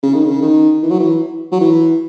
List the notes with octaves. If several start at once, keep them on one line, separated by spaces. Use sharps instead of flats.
C#3
D#3
C#3
D#3
E3
F#3
E3
F#3
E3